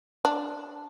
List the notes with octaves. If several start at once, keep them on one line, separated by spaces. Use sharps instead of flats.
D4